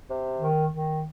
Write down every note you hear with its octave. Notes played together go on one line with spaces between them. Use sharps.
C3
D#3
D#3